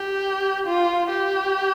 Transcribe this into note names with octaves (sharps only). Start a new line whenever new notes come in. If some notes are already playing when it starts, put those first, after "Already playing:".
Already playing: G4
F4
G4